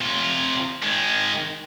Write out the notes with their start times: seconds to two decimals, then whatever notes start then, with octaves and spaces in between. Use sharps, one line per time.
0.01 C3 F4
0.83 D#3 G#3